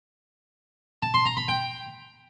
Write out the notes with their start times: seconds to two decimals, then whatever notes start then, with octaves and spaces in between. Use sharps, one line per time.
1.02 A5
1.14 C6
1.25 A#5
1.37 B5
1.48 G5